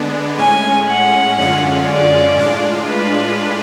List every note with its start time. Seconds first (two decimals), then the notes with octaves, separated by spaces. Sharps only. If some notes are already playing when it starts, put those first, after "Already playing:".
Already playing: D3 G#3 B3 D4
0.38 A2 G#3 C#4 G#5
0.88 F#5
1.38 F#2 D3 G#3 C#4 F4
1.87 D5
2.37 A2 G#3 D4 F4
2.88 B4